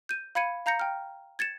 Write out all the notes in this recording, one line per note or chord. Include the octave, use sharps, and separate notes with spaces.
G6 D#7
F5 B5 G#6 C#7 D#7
F5 A#5 G6 A#6 C#7
G5 F6
G#6 A6 C#7 E7